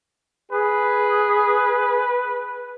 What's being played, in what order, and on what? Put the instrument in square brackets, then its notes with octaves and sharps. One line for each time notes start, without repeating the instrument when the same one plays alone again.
[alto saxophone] G#4 [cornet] B4